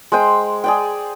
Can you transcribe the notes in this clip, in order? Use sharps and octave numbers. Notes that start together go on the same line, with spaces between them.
G#3 C5 G5 C6
G#4 D5 G5